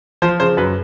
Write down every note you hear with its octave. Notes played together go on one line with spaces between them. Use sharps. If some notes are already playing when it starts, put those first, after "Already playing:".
F3 C5
C#3 C5
F#2 B4